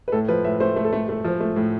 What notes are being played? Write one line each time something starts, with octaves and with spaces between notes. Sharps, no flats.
B4
A2 A4
F3 B4
A2 E5
A3 C5
A3
A4
A3
A3
F3
A3
A2